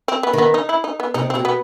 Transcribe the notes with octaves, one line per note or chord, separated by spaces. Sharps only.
C4
B3
D#3 B3
D#4
E4
D#4
B3
C3 D#4
B2 C4
B3